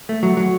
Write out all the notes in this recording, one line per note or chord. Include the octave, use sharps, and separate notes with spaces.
A3
F#3
F#3